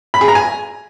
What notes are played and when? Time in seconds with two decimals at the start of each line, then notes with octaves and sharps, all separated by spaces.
0.14 B5
0.21 G#4
0.28 A#5
0.35 G#5